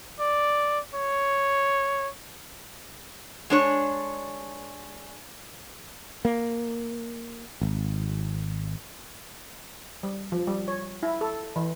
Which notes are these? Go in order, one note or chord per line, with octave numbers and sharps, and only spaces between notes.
D5
C#5
G#3 D4 C#5
A#3
G#1
G3
F3
G3
C#5
E4
A4
E3